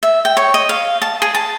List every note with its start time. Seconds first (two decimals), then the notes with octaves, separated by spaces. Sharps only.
0.03 E5
0.25 G5
0.37 C#5
0.54 D#5
0.69 F5
1.02 A5
1.22 G#4
1.34 A5